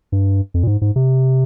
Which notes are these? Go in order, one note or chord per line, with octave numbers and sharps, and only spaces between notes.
G2
F2
A#2
G#2
G#2
C3